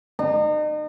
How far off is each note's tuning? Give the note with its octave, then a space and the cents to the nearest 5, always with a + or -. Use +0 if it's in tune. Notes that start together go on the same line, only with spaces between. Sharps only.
D#4 -40